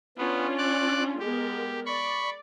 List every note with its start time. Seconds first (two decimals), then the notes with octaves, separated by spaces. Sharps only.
0.17 B3 C#4 D4 F4
0.58 D5 D6 F#6
1.19 G#3 B3 G4 A#4
1.86 D5 B5 C#6